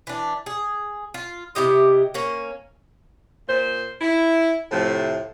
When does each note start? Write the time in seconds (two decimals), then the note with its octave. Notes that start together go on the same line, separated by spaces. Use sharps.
0.07 E3 D4
0.46 G#4
1.14 F4
1.55 C3 E4 G4 D#5
2.14 A#3 C#4
3.48 A#2 C5
4.01 E4
4.70 A2 C3 F3 A3